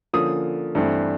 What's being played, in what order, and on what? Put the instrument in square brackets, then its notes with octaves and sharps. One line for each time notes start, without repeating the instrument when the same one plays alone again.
[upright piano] D3 F3 A#3 C#4 D#6
G2 E3 A3 C4